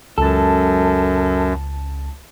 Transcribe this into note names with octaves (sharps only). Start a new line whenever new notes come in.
C#2 F#2 A4 A5